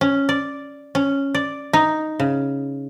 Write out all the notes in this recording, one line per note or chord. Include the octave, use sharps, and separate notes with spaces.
C#4
D5
C#4
D5
D#4
C#3